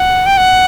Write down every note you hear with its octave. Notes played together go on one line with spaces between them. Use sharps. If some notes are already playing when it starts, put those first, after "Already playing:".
Already playing: F#5
G5
F#5